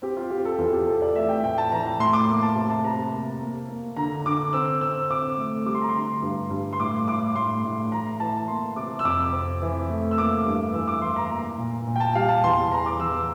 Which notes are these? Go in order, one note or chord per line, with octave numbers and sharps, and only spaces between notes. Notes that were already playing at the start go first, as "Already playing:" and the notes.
C4 G4
F4
C4 G4
A4
E2 F4
G4
C4 A4
D5
A3 E5
G5
A2 G5
A5
E3 A#5
A#5
A2 C6
D6
A#3
A5
C3
A5
C3 A#5
A#3
A#3
A#3
D3 A#5
D3 D6
C4 E6
C4 E6
C4 D6
A3
G3 D6
C6
A#5
C6
D3
G2
G2
C6
A2 D6
A2 D6
A2 C6
A2
E3 A#5
E3 A5
A#3 C6
C3 D6
E6
F2 D6
C4
E3
A3
E6
A#3 D6
G2
E3 E6
D6
E3 C6
A#5
A#3 A#5
A#2
A#2
G5
A5
G3 F5
A5
E2 C6
E2 A#5
D6
E2 E6